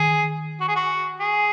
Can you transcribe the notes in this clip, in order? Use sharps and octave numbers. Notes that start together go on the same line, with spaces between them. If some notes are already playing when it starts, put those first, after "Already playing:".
Already playing: D#3 G#4
F#4
G#4
F#4
G#4